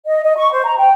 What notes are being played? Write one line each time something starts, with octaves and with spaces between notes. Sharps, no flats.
D#5
D#5
C#6
C5
A#5
G5